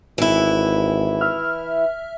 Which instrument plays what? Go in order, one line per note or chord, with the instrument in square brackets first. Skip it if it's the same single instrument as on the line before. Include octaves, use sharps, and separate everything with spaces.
[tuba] G#1 [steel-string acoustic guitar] E3 E4
[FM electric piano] E5 F6